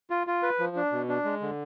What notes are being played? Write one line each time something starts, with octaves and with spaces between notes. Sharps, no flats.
F4
F4
B4
F3
D4
B2
D4
G#3
D3